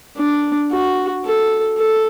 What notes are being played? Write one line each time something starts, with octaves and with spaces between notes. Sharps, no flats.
D4
F#4
A4
A4